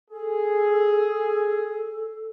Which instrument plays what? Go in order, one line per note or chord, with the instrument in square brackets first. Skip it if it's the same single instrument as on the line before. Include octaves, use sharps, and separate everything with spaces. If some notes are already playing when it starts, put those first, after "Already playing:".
[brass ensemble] G#4 [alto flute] A4